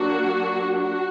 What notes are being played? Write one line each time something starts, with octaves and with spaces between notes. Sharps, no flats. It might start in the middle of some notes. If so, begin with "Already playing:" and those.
Already playing: F#3 A#3 D4 F#4
F#4